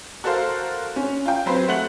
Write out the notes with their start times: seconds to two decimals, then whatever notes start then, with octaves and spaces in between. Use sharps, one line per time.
0.24 F#4 A4 A#4 C5 F5
0.96 C#4
1.26 F4 G5
1.46 F#3 C4 B4 C5
1.68 A3 F#5 F#6 F#7